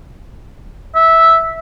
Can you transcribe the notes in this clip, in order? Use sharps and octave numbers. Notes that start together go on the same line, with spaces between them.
E5